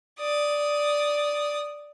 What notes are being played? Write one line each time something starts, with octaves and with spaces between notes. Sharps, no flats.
D5 D#6